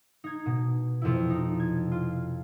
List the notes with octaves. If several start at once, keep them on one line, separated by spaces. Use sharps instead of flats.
D#4 G#6
B2
F2 C3 E4
D#4
G#6
F4